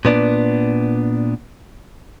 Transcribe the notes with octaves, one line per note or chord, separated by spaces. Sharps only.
A#2 B3 D4